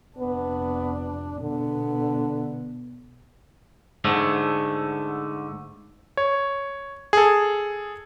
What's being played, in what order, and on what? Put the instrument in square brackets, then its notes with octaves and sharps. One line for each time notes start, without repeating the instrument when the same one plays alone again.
[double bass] F1 D4 [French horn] B3
[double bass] B2 B3 [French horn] D3
[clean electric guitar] G#2 D3 A3
[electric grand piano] C#5
G#4 A4